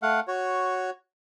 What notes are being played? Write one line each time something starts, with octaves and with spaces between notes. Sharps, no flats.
A3 F5 F#5
F#4 C#5